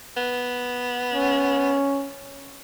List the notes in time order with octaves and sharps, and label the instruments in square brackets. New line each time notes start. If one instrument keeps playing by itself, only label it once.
[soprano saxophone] B3
[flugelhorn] C#4